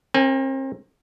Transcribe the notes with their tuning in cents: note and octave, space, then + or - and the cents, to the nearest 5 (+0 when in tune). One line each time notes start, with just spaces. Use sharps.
C4 +40 A#4 +0 G#5 +0